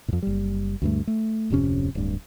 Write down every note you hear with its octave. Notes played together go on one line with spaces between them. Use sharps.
F2 A2
F#1 G3
D2 G2 A3
A3
D1 F2 C3 C#4
D1 G2